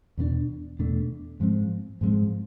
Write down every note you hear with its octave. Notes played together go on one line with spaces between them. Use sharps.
E2 B2 A3 D4
E2 B2 A3 D4
G#2 F3 G#3 C4
G#2 F3 G#3 C4